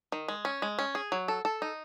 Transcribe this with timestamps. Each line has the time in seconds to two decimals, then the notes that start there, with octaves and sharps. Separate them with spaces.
0.12 D#3
0.28 G#3
0.45 C#4
0.62 G#3
0.79 C#4
0.95 G#4
1.12 F#3
1.28 A4
1.45 A4
1.62 D#4